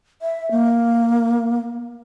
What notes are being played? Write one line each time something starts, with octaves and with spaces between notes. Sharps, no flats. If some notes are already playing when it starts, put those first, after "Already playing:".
E5
A#3